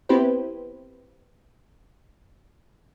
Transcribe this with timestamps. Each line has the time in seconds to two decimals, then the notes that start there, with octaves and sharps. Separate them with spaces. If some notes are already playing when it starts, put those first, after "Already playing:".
0.09 B3 C4 E4 G4 B4 C5